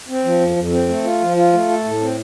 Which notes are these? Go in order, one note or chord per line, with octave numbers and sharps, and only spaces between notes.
C4
F3
F2
F2
C4
A3
F4
F3
F4
A3
A4
A2
C4